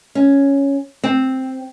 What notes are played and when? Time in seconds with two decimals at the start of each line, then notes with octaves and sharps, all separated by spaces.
0.15 C#4
1.04 C4